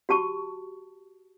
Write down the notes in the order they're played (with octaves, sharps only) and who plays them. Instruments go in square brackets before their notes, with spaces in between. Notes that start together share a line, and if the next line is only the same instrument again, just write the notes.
[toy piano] F#4 G4 A5 C#6